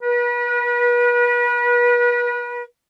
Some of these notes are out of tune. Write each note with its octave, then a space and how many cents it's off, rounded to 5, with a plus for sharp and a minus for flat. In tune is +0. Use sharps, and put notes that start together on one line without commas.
B4 -35